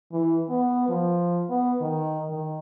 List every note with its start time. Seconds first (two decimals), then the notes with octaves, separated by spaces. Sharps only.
0.12 E3
0.50 B3
0.89 F3
1.50 B3
1.81 D#3
2.30 D#3